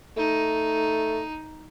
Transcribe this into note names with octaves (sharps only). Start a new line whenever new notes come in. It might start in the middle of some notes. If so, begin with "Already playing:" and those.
A3 D#4